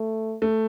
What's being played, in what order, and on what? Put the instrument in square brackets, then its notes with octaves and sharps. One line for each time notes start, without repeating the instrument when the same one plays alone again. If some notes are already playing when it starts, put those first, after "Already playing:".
Already playing: [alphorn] A3
[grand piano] A3